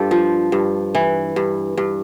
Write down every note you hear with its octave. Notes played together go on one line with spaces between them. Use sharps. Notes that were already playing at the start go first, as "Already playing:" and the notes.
Already playing: G2 D4 F4 G4 A4
F3
G2
E3
G2
G2